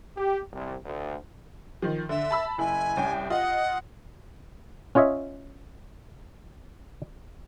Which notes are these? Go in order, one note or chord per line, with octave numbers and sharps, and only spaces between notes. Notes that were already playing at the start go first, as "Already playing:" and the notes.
G4
C2
D2
D#3 F3
D3 E5
A5 B5 E6
F#1 E4 G#5
C2 C#4 G5
F4 D#5 F#5
C#4 F4 C#5 D#5 E5